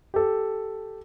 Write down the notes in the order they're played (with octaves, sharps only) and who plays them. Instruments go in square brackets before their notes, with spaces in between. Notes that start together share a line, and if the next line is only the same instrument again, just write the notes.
[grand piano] G4 A4